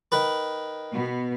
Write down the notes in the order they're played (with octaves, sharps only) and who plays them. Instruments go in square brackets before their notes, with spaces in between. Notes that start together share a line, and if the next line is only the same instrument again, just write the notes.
[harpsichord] D#3 B4
[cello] B2 B3